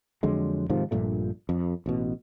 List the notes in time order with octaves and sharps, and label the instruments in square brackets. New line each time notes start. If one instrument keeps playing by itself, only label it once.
[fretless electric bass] F2 D3 F#3 G#3
G#2 C3 D#3 F3
A#1 G2 A#2 A3
F2
A1 B2